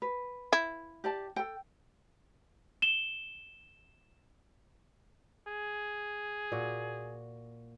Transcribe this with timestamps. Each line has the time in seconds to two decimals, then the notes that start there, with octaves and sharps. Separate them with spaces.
0.02 B4
0.53 E4
1.04 G4 D5 A5
1.36 A4 G5
2.82 E7 G7
5.48 G#4
6.52 A#2 F#4